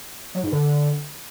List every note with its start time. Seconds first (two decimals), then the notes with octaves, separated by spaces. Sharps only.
0.35 F#3
0.43 G#2
0.52 D3